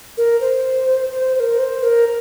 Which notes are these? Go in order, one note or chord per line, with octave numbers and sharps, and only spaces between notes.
A#4
C5
C5
C5
A#4
C5
A#4